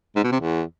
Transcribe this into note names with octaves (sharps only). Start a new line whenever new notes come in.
G#2
B2
C3
E2